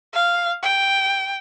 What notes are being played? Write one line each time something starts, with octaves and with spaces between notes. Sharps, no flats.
F5
G5